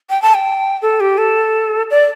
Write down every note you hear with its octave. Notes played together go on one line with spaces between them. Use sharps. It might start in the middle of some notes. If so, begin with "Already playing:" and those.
G5
A5
G5
A4
G4
A4
D5